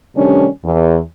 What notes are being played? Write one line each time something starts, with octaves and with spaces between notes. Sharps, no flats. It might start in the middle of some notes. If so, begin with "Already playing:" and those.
C3 D#3 G3 A3 C#4 D4
E2